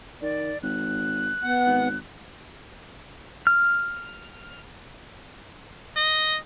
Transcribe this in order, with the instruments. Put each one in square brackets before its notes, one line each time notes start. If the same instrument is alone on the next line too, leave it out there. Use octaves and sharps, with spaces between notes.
[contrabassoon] D#3 [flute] D5
[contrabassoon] G#1 [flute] F#6
[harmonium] B3 F#5
[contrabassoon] G#1
[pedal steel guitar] F6
[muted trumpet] D#5